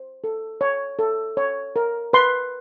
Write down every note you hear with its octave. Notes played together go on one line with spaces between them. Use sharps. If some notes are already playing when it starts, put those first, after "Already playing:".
Already playing: C5
A4
C#5
A4
C#5
A#4
B4 C6